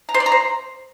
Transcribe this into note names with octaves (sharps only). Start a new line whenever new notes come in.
A#5
C5
D5
A#5
C5